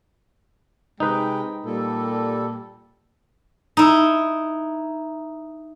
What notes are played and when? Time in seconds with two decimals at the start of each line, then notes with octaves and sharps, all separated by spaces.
1.00 C3 G#3 D#4 B4 G5
1.65 A#2 G3 A4
3.77 D#4 E4